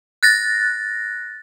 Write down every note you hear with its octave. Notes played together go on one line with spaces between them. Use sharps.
F#6 A6 A#6